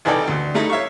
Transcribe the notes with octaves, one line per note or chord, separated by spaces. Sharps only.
C2 E3 D#4 A4 D5 G5
D2
G3 A3 D#4 E4 D#5
C#5 E5 F5 C#6